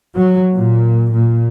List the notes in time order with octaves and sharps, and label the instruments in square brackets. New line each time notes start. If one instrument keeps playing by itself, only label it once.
[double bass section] F#3
A#2
A#2